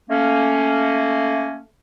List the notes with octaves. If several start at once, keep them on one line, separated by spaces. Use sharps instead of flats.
A3 A#3 C#4